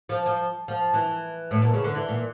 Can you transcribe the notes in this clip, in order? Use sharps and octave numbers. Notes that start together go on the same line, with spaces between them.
F3
F3
F3
E3
A2
A#2
C#3
D3
E3
A#2